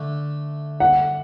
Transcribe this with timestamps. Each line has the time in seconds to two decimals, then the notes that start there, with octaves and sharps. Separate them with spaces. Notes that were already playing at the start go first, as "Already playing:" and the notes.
Already playing: D3 A3
0.80 F#5